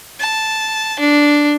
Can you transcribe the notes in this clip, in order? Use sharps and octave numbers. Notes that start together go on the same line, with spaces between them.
A5
D4